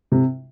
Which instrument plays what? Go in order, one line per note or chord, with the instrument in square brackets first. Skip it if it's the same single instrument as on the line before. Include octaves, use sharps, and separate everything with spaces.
[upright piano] C3